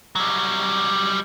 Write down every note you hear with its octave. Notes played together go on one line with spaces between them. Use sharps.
F#3 G3